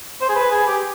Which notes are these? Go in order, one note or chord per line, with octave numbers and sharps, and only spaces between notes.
C5
G#4
B4
G#4
G4